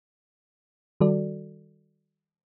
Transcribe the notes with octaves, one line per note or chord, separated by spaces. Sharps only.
D#3 G3 F#4 A4 D5